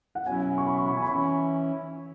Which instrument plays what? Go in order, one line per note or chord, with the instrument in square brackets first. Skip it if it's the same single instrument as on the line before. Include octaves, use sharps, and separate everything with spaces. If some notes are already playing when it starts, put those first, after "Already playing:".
[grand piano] F#5
[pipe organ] B2 F#3 C#4 E4 [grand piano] G#5
[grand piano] C#6
B5
C#6
B5
G#5
B5
[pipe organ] E3 C#4 E4 [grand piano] C#6